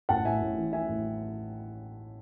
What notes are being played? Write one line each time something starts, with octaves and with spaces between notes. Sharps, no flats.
A1 F#5 A5
A2 E5 G#5
A2
E3
E3 E5 G#5
A2